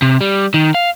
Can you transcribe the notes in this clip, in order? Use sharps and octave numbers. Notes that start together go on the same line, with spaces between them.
C3
G3
D#3
F5